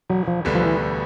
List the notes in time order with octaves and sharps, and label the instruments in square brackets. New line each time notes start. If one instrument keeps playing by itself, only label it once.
[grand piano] E1 [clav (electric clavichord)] F#3
[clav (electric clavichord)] F3
[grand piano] D2 D3 G3 B3
[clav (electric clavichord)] F3
E3
[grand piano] E1